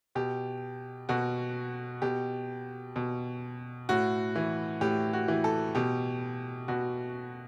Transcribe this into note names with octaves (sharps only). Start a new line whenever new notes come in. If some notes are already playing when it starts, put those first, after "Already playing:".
B2 G4
B2 F#4
B2 G4
B2
A2 F#4
E3
A2 G4
F#4
E3
A4
B2 G4
B2 F#4